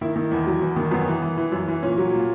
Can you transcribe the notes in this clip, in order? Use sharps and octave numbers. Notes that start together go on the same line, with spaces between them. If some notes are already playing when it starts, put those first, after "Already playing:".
D#3 E4
D#3
E2
F#3
E2
D#3
F#2 B3
E3
E3
E3
F#2
E3
A#2 C#4
F#3
A#2